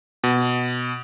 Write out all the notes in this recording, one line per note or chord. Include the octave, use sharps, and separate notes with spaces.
B2